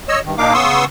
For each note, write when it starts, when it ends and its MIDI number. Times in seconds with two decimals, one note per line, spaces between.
0.08 0.20 73
0.08 0.20 75
0.08 0.20 88
0.25 0.35 43
0.25 0.35 51
0.38 0.53 46
0.38 0.53 58
0.38 0.53 62
0.38 0.53 63
0.38 0.53 77
0.38 0.53 86
0.54 0.85 49
0.54 0.85 59
0.54 0.85 84
0.54 0.85 85
0.54 0.85 87
0.54 0.85 88